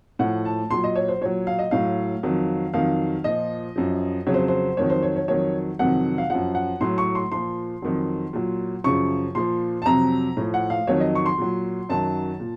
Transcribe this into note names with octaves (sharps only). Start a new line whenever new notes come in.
A2 F3 F#5
A5
A#2 F#3 C6
D#5
C#5
C5
A#2 F#3 C#5
F5
D#5
A2 F#3 F5
F2 D#3 F#3
F2 D#3 F#3 F5
A#2 F3 D#5
F#2 F3
F2 C#3 F#3 C#5
C5
C5
F2 D#3 F#3 C#5
C5
C#5
C#5
F2 D#3 F#3 C#5
F2 C3 D#3 F#3 F#5
F5
F#2 F3 F#5
F#5
A2 F#3 C6
C#6
C6
A#2 F3 C6
F2 D#3 F#3
A#2 F#3
F#2 C#3 F3 C#6
A#2 F3 C6
A5
F2 C3 F#3 A#5
A2 F3
F#5
F5
F2 D#3 F#3 C#5
D#5
C#6
C6
A#2 F#3
F#2 D#3 F#3 A5
A#2